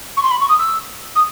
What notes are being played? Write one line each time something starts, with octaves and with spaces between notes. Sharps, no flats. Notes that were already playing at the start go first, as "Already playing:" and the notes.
C#6
C6
B5
C#6
D#6
E6
D#6